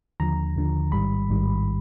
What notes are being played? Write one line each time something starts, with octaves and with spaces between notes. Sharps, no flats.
D#2 D3 F3 A#5
D#2 D3 F3
A1 G#2 D#3 G3 B5
A1 G#2 D#3 G3